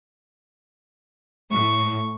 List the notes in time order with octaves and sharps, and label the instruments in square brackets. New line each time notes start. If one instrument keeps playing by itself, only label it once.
[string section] A2 [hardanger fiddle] C#6